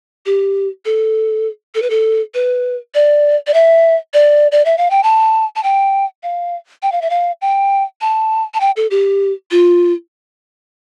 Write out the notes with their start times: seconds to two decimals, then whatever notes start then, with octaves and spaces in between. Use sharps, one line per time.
0.26 G4
0.85 A4
1.75 A4
1.82 B4
1.90 A4
2.34 B4
2.95 D5
3.47 D5
3.54 E5
4.14 D5
4.52 D5
4.65 E5
4.78 F5
4.91 G5
5.03 A5
5.56 A5
5.63 G5
6.23 F5
6.82 G5
6.92 F5
7.02 E5
7.10 F5
7.42 G5
8.01 A5
8.54 A5
8.60 G5
8.77 A4
8.91 G4
9.51 F4